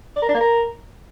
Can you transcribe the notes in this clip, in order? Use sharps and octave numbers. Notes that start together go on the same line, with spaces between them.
D5
A#4
D4
A#3
A#4